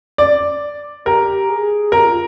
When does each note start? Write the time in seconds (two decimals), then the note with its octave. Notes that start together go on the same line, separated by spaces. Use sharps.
0.18 D5
1.05 G4 A#4
1.49 G#4
1.92 G4 A#4
2.04 F4